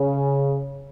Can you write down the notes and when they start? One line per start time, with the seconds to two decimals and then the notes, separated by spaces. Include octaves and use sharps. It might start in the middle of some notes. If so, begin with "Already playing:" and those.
Already playing: C#3